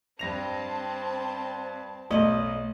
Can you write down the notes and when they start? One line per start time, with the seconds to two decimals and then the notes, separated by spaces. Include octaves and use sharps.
0.19 G2 C4 A5 A#6 F7
2.11 B1 A3 D#5 F#7